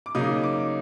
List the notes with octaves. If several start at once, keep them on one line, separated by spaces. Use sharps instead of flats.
D6
C#3 F#3 A#3 D#4 D#6
D6